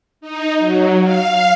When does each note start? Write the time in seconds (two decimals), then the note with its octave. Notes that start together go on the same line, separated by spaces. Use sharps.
0.21 D#4
0.59 F#3
1.03 F5